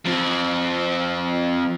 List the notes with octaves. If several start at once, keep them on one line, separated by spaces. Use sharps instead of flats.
F3 C4